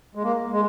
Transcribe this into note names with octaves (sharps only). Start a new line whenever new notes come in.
G#3
A#3
G#3